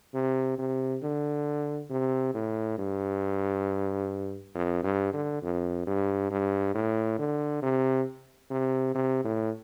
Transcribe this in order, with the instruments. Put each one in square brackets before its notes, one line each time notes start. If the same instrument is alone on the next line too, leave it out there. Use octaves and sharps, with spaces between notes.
[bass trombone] C3
C3
D3
C3
A2
G2
F2
G2
D3
F2
G2
G2
A2
D3
C3
C3
C3
A2